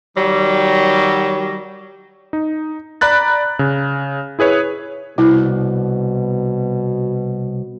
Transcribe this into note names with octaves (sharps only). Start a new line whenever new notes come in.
D#3 F#3 G3
D#4
D5 A#5 B5 F#6 A6
C#3
E4 G#4 B4 C#5
C2 B2 E4